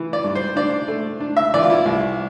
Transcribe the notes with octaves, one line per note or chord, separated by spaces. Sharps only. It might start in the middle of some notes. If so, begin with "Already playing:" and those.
Already playing: E3 E4
D5
G2
C5
D4 D5
A3
D4
E5
E3 D5
F4
E4
C2